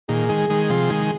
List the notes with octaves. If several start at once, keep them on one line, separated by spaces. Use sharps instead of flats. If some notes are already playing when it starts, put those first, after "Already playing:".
A#2 D#3 G#4
D#3 G#3
D#3 G#3
C3 F3
D#3 G#3